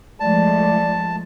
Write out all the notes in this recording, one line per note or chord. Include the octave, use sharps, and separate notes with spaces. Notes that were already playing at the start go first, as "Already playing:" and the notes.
F3 G#3 A3 D5 A5